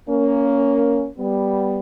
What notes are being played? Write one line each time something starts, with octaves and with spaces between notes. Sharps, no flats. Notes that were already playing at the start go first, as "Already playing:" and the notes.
A#3 C#4
G3 B3